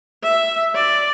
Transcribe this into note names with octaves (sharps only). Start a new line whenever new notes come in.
E5
D5